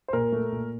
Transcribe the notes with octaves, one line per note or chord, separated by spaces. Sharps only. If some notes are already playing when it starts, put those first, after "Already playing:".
C5
A#2 A#4
A3
A#2